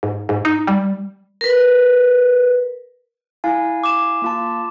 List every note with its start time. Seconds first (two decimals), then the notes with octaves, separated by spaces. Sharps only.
0.03 G#2
0.29 G#2
0.45 D#4
0.67 G3
1.41 A#4 B4
3.44 E4 F5 G#5
3.84 D6 E7
4.22 A#3 F4 A5